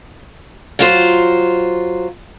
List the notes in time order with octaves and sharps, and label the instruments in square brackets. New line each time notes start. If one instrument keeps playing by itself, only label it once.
[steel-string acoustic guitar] F#3 F4 C5